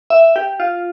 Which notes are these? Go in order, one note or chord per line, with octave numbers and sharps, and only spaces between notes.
E5
G4
F4